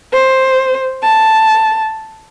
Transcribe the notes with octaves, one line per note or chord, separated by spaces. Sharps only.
C5
A5